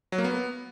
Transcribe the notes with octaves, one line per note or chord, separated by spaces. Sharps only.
F#3
A#3
B3